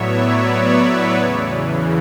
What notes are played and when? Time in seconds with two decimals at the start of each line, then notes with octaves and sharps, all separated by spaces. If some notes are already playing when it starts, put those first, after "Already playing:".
Already playing: A2 F#3 B3 B4 C#5 D5 E5
0.32 B4
1.18 E2 C#3 E3